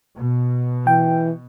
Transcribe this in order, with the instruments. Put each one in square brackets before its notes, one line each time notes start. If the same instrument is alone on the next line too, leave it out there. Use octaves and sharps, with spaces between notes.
[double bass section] B2
[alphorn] E3 [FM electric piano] G5